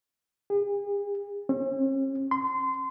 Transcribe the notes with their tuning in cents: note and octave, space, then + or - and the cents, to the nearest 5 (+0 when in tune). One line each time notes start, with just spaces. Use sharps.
G#4 -40
C#4 -45
C6 -25